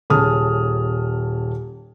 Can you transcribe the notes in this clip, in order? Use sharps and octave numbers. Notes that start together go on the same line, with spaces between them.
D#1 C#4 G#4 A5 D#6 F6